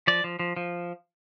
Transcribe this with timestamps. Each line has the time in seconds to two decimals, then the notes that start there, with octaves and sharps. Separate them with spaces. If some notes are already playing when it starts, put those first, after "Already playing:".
0.07 F3 D5
0.24 F3
0.39 F3
0.57 F3